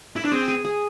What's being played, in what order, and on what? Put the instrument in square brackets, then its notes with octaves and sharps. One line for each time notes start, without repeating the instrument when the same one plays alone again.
[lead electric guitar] E4
D4
[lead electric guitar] C4 [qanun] G#4
[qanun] G#4
G#4